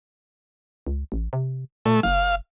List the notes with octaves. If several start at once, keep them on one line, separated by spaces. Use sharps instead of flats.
C#2
A1
C3
A#2 A3
F#1 F5